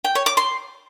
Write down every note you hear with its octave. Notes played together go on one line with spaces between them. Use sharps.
G5
C#5
D6
C6